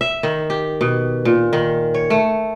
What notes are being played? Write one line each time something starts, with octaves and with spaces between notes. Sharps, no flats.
E5
D#3
G4
B2
A#2
D#3
C#5
A3